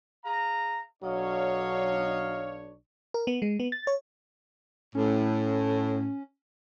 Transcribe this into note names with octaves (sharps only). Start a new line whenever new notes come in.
G#4 F5 A#5
B1 F#3 D4 C#5 D#5 F5
A#4
B3
G#3
B3
A6
C#5
A2 C#4